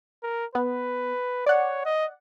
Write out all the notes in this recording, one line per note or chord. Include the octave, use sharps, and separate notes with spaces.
A#4
B3 B4
C#5 D5 F#5
D#5